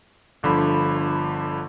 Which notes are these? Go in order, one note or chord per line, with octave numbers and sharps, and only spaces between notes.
G1 D3 F3 B5